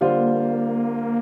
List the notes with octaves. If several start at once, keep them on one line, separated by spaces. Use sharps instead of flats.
D3 G3 A#3 D4 F4 C5